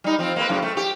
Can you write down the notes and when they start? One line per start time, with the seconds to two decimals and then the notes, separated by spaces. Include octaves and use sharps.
0.04 G3 D#4
0.19 F3 C4
0.36 A#3 C4 B4
0.49 F#2 A2 C#3
0.62 A3
0.77 G4